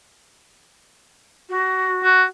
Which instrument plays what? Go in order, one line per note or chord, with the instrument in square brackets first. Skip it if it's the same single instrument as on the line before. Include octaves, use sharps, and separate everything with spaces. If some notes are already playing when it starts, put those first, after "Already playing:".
[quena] F#4
[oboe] F#4